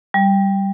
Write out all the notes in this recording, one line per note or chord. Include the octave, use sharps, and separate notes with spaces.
G3